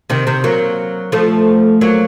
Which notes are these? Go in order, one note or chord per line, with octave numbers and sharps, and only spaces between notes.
C3 D#3
C3 D#3
F#3 A#3
F3 A3
F#3 A#3